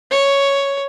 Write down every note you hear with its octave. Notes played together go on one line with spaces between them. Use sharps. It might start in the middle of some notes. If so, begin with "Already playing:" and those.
C#5